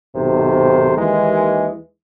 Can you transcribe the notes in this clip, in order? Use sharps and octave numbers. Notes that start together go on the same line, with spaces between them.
B1 G#2 C3 D#3 A#4 C5
D#2 E3 G#3